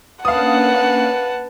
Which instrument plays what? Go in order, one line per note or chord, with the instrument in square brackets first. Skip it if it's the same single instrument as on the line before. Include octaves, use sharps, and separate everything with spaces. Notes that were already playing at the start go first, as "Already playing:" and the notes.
[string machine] A#3 C#4 D4 [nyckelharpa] B4 A5 [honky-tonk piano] F5 D#6 [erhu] F#5